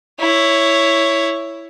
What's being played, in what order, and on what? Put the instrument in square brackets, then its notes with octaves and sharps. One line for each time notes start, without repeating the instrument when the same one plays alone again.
[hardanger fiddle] E4 C#5